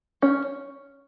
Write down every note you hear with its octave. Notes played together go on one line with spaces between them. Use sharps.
C#4